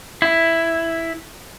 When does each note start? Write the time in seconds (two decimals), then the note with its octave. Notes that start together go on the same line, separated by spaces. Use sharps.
0.22 E4